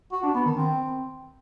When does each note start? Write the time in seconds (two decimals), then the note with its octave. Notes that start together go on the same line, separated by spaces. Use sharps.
0.12 F#4
0.23 D4
0.34 B3
0.46 D#3
0.57 C4